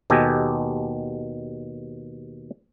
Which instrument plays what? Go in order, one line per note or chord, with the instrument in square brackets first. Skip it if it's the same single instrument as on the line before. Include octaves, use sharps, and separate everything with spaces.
[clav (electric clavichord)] D#2 B2 G4 A4 D#5 G#5